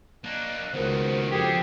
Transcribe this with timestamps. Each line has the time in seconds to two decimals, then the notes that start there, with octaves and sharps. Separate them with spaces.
0.24 A#3 D4 D#5 F#6
0.74 C#2 D#3 B3 F#4 A#4 C5
1.32 F2 D3 G4 G#4